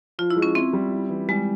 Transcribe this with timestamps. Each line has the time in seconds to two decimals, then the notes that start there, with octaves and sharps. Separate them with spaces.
0.19 F3 F4
0.30 E4
0.36 G#3
0.42 C#4
0.55 C4 E4
0.73 G3
0.92 E4
1.10 E3
1.28 G3 G#3